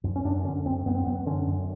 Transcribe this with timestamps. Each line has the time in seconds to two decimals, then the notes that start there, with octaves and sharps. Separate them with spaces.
0.04 F#2
0.16 C#4
0.25 F#2 D4
0.44 D3 C#4
0.66 F#2 C4
0.86 F#2 B3
0.95 C4
1.04 B3
1.06 F#2
1.26 D3 C#4
1.47 F#2